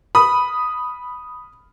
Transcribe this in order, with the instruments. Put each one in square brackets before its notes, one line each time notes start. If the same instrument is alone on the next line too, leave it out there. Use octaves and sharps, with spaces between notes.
[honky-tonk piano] B5 D#6